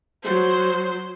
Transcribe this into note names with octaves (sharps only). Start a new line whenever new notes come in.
F#3 C5